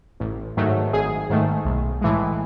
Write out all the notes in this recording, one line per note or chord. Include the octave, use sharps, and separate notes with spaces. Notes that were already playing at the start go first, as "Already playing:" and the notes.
A1
G#2 D#3 F#3 A3
G#1 G#4
G#2 D#3 A3
B1
A2 E3 G#3